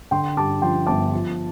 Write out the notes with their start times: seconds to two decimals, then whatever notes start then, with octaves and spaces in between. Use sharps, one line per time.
0.11 D3 G5 C6
0.37 G2 A5 D6
0.62 F3 G5 C6
0.87 G1 A5 D6
1.13 F3